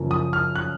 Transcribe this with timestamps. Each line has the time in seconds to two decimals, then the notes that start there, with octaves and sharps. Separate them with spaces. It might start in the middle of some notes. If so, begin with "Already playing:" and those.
Already playing: F#2 C#3 F3 A#3
0.11 D#6
0.33 F6
0.56 F#6